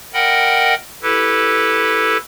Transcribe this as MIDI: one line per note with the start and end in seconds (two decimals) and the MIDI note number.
0.14 0.74 70
0.14 0.74 75
0.14 0.74 78
0.14 0.74 79
0.14 0.74 83
1.02 2.17 64
1.02 2.17 67
1.02 2.17 69
1.02 2.17 71